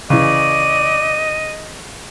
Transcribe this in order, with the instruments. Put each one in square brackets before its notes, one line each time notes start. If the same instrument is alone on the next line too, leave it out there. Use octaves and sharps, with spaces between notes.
[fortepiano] C#3 E3 [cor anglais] D5 [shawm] D#5 [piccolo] D#7